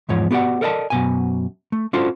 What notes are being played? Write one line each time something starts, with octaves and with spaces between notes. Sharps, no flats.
E2 G#2 F3 C#5
B3 F#4 G4 D5 F#5
A4 A#4 D5 D#5 F#5 A5
F#2 B2 G#5
A3
C#4 D4 F4 F#4 A4 C5